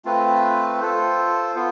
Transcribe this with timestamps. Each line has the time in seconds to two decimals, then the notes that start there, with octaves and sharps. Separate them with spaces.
0.05 A3 C4 F4 B4
0.80 F4 A4 C5
1.55 B3 F4